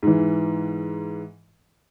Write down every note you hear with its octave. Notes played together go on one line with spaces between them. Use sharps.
G#2 E3